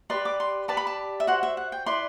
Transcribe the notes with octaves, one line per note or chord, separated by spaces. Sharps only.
G4 B4 D5 C6
D6
C6
G4 B4 D5 A5
B5
A5
E5
F#4 C5 F#5
E5
F#5
G5
E4 B4 D5 C6